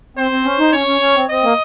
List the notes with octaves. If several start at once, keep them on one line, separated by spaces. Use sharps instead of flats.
C4 C5
C4
C#4
D#4
C#4 C#5
C#4
C#4
C4
C4 D#5
A#3